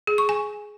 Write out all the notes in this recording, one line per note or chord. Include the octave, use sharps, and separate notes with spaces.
G#4
C#6
G#5